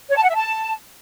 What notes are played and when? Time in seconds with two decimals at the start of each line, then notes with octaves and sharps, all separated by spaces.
0.10 C#5
0.16 A5
0.22 F#5
0.29 E5
0.35 A5